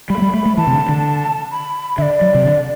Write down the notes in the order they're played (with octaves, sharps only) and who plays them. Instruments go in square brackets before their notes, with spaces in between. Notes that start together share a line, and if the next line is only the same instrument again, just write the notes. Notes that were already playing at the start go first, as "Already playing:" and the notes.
[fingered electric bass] G3 [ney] B5
[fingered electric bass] A3
G3
A3
A3
[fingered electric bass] E3 [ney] A5
[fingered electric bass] C3
D3
D3
[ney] B5
[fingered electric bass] D3 [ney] E5
[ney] D5
[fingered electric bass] F#3
C3
D3